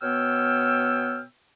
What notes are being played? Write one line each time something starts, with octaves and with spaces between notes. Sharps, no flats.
B2 B3 C#5 G5 E6 F6